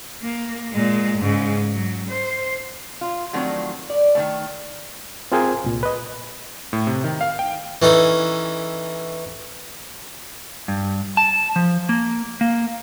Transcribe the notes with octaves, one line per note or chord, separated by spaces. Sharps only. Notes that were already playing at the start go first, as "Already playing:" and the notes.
A#3
A#2 G#3
G#2 C#3
F#3
C5
F4
D#3 F3 F#3 A3 C4 D4
D5
D#3 E3 A3
C4 F4 G#4 A#4 C5 G#5
C2 A#2
B4 D#5
A2
C3
D#3
F5
G5
E3 C#4 D#4 A4
G2
A5
F3
A#3
A#3